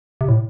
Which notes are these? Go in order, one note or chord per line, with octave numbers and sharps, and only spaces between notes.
C3
A2